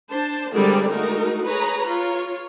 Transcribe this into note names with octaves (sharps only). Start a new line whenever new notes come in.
D4 C5 A5
D3 G3 G#3 C4 A#4 D5
G#3 A3 D#4 F#4 A#4
G#4 B4 C#5 A#5
F4 C#5